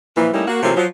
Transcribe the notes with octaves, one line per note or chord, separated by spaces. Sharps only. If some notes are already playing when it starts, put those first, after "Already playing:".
A#2 E3 F3
G3 A3 A#3 C#4 D#4 E4
A#3 F#4
C3 E3 F#3 A3 A#3 F4
F3 F#3